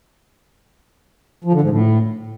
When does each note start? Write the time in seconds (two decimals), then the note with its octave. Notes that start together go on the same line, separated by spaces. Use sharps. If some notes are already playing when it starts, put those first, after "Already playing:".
1.44 F3
1.53 D3
1.61 G#2
1.70 A2